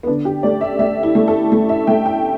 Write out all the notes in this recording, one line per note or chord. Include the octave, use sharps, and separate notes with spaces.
B3
D3 D4
G4
A3 D5
E5
A3 E5
E4
A3
A4
A3
E5
A3 G5
G5